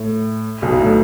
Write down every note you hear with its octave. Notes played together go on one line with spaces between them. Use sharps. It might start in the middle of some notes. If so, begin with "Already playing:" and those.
Already playing: A2
B1 B2
A2